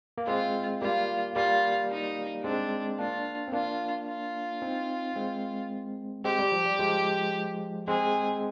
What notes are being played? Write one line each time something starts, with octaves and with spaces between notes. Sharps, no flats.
A#3
G#3 C4 F4
G3 A#3 F4
G3 A#3 F4
D#4
G#3 C4 D4
A#3 D4 F4
C4
A#3 D4 F4
F4
C4 D#4
G#3 C4
G#3 C4 G4
G3
F3
G3
F3 G#3
G#3 C4 G#4